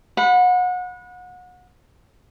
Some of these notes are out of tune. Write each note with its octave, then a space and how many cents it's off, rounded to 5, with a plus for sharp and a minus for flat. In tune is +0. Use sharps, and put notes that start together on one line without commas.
F#5 -30 B5 +0